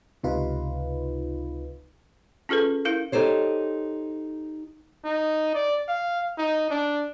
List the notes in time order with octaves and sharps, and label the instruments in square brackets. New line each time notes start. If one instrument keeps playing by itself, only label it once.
[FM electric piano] C#2 C3 D#4 F4 B4
[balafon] C#4 F4 G#4 A4 B4
E4 A#4 F5
[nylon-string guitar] D#4 G4 A4 C5 C#5
[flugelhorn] D#4
D5
F5
D#4
D4